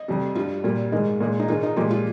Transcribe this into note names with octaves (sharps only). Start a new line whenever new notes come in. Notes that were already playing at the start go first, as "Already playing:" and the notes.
Already playing: D#5
F2 C3 G3
G2 G3 F4
A#2 G3
G#2 D#3 G#3
A#2 G#3
D#4
G#2 D#3 G#3 F4
D#4
A#2 F3 G#3 G4
F4